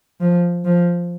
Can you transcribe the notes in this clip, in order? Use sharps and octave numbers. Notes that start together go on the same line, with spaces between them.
F3
F3